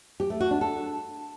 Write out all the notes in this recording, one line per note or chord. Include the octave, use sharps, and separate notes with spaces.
G4
A3
F#4
D4
A4